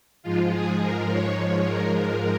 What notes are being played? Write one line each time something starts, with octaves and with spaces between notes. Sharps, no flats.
G#2 F3 G#3 F4
G#4
A#4
C#5
C#5
A#4
A#4